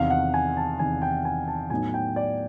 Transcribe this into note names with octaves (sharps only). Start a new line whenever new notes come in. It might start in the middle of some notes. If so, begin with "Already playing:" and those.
Already playing: E2 C3 D#3 F5
F#5
G#5
A5
E2 C3 D#3 G#5
G5
G#5
A5
A2 F#3 B3 D#4 G#5
G5
D5